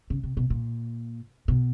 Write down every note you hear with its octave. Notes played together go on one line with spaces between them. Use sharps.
C#3
C3
B2
A#2
B2